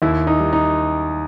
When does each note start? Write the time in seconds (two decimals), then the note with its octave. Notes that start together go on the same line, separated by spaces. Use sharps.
0.02 D#2 E4
0.27 D#4
0.40 D#3 G3
0.53 D#4